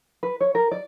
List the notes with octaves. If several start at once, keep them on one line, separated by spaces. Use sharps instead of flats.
B4
C#5
A#4
D5